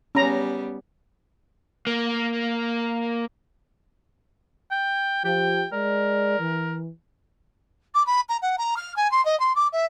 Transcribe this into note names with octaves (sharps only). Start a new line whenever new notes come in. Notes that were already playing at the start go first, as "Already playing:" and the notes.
G3 B3 C#4 A#5
A#3
G5
F3 G4 G5
G#3 A#4 D5
E3
D6
B5
A#5
F#5
A#5
F6
G#5
C6
D#5
C6
D6
E5